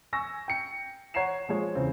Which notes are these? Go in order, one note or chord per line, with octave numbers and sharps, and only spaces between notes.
G#5 C#6 E6 A#6
G5 C#7
C#5 F#5 A#5 C7 E7
F3 G#3 C#5
E2 C#3 C4